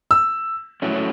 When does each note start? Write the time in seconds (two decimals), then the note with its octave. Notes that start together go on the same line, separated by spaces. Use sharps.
0.11 E6
0.82 A2 F#3 A3 C#4